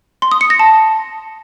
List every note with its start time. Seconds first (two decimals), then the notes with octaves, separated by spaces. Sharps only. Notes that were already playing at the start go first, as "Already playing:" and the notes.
0.22 C6
0.32 D#6
0.41 C#7
0.50 A#6
0.59 A5